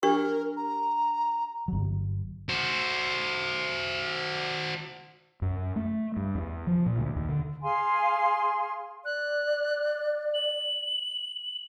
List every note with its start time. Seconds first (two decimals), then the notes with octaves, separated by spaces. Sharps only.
0.03 D4 G4 A#4 C#6
0.57 A#5
1.68 G1 F#3
2.49 F#4 C5
5.42 F#2
5.76 A3
6.17 G2
6.35 E2
6.67 F3
6.86 A#2
6.99 D2
7.16 D#2
7.29 D3
7.62 G#4 F5 G#5 C6
9.05 D5 F#6
10.34 F#7